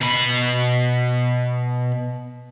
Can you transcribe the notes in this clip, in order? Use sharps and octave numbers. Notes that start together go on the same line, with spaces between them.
B2 B5